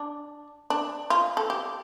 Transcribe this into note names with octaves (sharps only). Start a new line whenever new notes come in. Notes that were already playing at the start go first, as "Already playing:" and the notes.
Already playing: D4
D4
F4
A4
G4